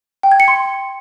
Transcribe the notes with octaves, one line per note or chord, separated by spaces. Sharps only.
G5
G#6
C#7
C6